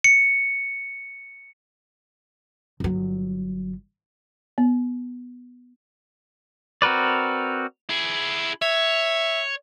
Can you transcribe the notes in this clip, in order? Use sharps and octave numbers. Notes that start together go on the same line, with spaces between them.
C#7
G1 F#3
B3
C4 F#4 A#4 B4 D5
E4 G#4
C#5 E5